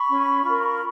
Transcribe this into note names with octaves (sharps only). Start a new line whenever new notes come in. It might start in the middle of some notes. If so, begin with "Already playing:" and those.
Already playing: B5 C#6
C#4
F4 A#4